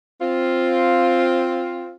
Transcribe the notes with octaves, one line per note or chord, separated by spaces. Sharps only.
C4 F4